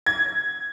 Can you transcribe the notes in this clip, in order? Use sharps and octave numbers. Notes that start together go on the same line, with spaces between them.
G#6